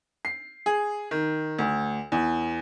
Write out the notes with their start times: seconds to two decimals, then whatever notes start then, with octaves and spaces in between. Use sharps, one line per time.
0.25 C7
0.66 G#4
1.11 D#3
1.59 D2
2.12 E2